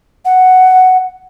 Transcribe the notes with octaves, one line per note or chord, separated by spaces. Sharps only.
F#5